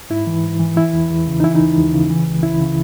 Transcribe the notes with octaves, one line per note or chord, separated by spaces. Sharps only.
G#2 E4
E3
G#2
E3
E3 E4
E2
E2
C#3
D#4
E3 E4
D#4
D#2
D#2
C#3
E3
C#2
C#2 E4
C#3